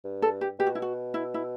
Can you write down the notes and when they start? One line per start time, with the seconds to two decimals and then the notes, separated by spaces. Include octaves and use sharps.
0.05 G2
0.22 A4
0.41 G4
0.60 B2 G4
0.67 F#4
0.75 E4
0.82 F#4
1.14 E4
1.34 E4